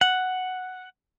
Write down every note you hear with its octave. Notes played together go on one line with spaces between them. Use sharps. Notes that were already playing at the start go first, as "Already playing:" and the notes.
F#5